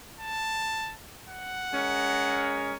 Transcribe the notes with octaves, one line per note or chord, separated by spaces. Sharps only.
A5
F#5
G#3 C#4 A#4